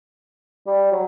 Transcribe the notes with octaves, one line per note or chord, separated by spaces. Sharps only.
G3
F#3